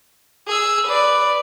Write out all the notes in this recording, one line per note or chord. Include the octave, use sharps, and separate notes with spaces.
G#4 E6
B4 D5